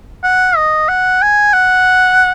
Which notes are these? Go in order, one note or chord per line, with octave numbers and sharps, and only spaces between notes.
F#5
D#5
F#5
G#5
F#5